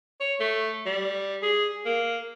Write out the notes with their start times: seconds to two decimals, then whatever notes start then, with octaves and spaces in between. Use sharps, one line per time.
0.20 C#5
0.40 A3
0.86 G3
1.42 G#4
1.86 A#3